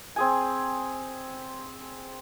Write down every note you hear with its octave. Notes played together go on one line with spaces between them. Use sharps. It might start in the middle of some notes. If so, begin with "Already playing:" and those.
C4 G#4 G#5